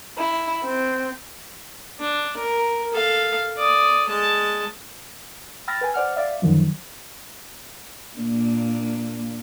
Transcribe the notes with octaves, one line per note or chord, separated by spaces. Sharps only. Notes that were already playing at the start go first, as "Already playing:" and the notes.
E4
C4
D4
A#4
A4 F5
D5 D#6
G#3 A5
G5 B5 E6 F6 A6 A#6
B4 G5 G#5
C5 D5 F#5 F6
D5 E5 F5
F#2 D3 D#3 F3 F#3
A#2 A#3 D4